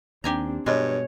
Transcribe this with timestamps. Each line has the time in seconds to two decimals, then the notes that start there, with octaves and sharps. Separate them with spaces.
0.24 D#2 C4 D4 G4 G#5 A#5
0.66 G2 B2 G#3 C#5